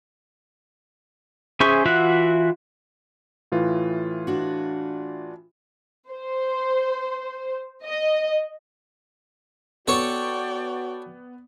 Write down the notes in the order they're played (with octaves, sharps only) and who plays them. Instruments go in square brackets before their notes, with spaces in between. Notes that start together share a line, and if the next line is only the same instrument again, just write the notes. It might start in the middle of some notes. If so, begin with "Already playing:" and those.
[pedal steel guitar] C#4 G#4 C5 E5 C#6
E3 F4 F#4 E5 F#5
[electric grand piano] A2 E3 F4
[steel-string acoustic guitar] D4 F#4
[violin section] C5
D#5
[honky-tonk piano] B3 [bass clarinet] F#4 [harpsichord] A4 C#5 [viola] D5 G5